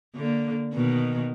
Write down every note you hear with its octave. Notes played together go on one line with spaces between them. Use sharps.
D3 A#3
B2 D#3